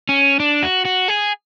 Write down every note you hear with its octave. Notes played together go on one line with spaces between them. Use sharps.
C#4
D4
F#4
F#4
G#4